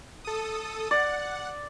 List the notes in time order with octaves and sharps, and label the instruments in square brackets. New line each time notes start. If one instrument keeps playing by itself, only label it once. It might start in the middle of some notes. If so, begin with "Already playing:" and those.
[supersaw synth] A4 D#6
[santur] D5 [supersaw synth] F#5